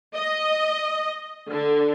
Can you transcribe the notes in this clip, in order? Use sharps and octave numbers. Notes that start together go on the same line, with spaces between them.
D#5
D3